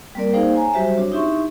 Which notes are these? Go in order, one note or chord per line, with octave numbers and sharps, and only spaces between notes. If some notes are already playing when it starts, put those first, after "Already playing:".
G3 A#3 C4 A#4 D5
A#3 D#4 G#4 C5 F5 G5
C#5 G#5 A#5
F#3 G3 F#4 G4 C5 E5
C4 D4 F#4 C#5
D#4 E4 G4 E5 C6 C#6